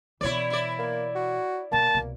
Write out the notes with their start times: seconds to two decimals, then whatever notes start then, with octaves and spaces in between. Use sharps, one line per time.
0.21 B2 E3 E4 C#5 D5
0.50 E4 D5
0.79 A#3
1.15 F#4
1.72 B2 G3 A#3 A5
1.94 C2 B2